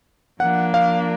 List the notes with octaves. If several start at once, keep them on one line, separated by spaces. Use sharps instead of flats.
F3 A#3 D4 F#5
F5